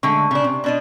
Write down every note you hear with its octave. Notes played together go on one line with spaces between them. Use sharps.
D3 G#3 A3 C#6
C#3 D4
C3
B2 D4 D#5